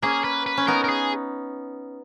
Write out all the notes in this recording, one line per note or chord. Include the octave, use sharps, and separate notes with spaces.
A#3 C#4 G#4
B4
B4
C#4
B3 D#4 A#4
A#4
G#4